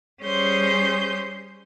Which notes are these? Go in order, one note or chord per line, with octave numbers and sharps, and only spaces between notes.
G3 C#4 G#4 C5 C6 G6